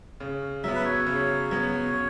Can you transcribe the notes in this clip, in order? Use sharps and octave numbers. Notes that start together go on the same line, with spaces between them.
C#3
F#3 B3 E5
B4
C#5
C#3
F#3 B3
C#3